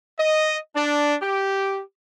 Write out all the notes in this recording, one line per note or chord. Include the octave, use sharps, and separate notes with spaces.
D#5
D4
G4